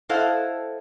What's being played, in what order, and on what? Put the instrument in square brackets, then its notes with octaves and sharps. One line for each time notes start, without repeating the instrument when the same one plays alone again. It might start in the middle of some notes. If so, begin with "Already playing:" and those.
[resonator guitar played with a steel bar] E4 A4 C5 D#5 F5 F#5